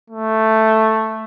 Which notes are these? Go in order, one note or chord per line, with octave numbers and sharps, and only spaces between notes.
A3